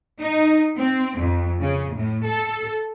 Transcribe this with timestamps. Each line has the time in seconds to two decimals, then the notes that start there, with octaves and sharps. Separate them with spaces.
0.20 D#4
0.77 C4
1.19 F2
1.60 C#3
1.95 A2
2.26 A4